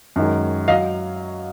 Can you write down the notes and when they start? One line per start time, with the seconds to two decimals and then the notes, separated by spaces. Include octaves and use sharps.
0.16 F#2 D#3 G#3
0.68 F#3 D#5 F5